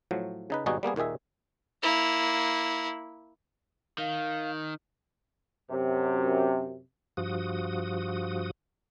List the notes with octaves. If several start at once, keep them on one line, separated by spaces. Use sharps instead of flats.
A2 F3 F#3
C#3 D#4 B4
G#1 B2 G3 D#4 F#4 G#4
G3 A#3 B3 G#4
D#2 A#2 D#3 G#4 E5
A#3 E4
D#3 F5
F#2 C3
G2 F3 F#4 D#6